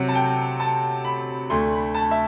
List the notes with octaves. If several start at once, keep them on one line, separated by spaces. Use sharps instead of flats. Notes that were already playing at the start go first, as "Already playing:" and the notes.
Already playing: C3 F#3 C4 F#5
A5
G5
A5
B5
D2 D3 A3 C6
B5
A5
E5